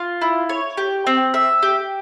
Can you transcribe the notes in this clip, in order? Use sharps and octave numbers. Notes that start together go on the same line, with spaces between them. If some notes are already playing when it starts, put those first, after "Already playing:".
Already playing: F4
E4
C#5
G4
C4
E5
G4